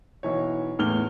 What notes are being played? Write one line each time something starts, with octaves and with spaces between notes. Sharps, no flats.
B1 E3 C#5
E2 A2 F6 G7